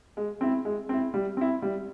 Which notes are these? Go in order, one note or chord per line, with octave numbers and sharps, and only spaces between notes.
G#3
C4 E4
G#3
C4 E4
G3
C4 E4
G3